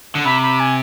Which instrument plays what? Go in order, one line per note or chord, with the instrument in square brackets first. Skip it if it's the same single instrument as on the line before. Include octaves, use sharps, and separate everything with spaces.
[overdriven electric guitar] D3
[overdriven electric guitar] C3 [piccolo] B5
[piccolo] B5
G#5